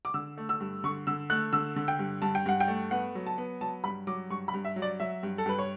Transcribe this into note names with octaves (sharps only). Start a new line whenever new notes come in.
D6
D3 E6
A3
E6
G2
D3 C#6
D3 E6
A3 F#6
D3 E6
D3
G5
G2
G2 A5
G5
G2 F#5
G5
A3
B3 F#5
F#3
A5
B3
F#3 A5
G2 B5
F#3 D6
G2 C#6
B5
G2
E5
F#3
D5
F#3 E5
G2
A4
G2 B4
C#5